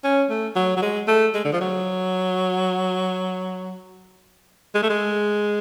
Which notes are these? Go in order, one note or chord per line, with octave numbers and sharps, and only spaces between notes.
C#4
A3
F#3
F#3
G#3
A3
G#3
D3
F3
F#3
G#3
A3
G#3